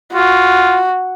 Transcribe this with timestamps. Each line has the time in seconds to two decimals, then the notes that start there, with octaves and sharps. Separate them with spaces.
0.13 F4 F#4